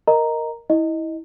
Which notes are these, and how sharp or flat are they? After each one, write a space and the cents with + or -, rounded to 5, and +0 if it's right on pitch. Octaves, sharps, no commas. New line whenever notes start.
A#4 +0 D#5 +0 A#5 +0
E4 -20 D#5 +0